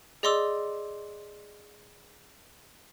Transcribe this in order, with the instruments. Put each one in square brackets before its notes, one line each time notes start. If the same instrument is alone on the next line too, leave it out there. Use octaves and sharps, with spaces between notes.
[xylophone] G#4 D5 D#5 C6 D6 E6